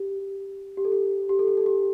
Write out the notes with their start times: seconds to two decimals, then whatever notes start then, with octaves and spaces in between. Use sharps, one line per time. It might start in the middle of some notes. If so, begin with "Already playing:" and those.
Already playing: G4
0.77 G4
0.85 A4
0.92 G4
1.29 G4
1.39 A4
1.48 G4
1.57 A4
1.66 G4